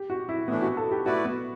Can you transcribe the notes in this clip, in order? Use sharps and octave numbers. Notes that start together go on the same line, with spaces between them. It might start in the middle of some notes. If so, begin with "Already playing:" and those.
Already playing: G4
F#4
E4
A2 E3 A3 B3 D4
F#4
A4
G4
A3 E4 F#4 B4 D5
B3